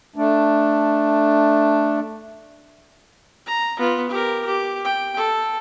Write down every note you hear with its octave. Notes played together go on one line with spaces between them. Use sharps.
A3 D4
A#5
B3 F4
G4 A#4
G4
G5
A4